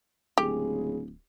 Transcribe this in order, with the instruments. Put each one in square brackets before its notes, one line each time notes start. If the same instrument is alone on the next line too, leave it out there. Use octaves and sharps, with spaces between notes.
[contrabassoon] D1 [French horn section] C#3 G#3 G#4 [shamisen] G4